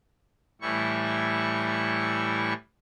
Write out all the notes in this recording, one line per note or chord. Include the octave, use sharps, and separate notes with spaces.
A2 E3 G3 E4 C#6